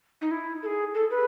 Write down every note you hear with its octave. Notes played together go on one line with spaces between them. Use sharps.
D#4
E4
A4
G#4
A4
B4